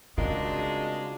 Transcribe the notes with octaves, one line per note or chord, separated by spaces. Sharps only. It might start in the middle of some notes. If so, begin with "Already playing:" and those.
C2 C#3 G#3 D4 F4 F#4 A#4